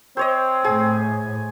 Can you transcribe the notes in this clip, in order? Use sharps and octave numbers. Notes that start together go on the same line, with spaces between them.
C4 C5 C#5 D#5
A2 G#4